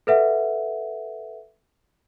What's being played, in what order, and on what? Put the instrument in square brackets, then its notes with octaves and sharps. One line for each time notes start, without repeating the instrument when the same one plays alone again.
[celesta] A4 B4 E5 F#5